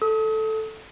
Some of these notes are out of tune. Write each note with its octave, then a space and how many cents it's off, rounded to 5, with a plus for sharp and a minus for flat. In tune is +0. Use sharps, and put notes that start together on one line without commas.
A4 +0 D#6 +40